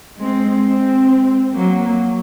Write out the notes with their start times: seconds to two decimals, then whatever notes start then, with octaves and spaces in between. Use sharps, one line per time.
0.19 G#3 C4
0.64 G#3 C4
1.54 F#3 A#3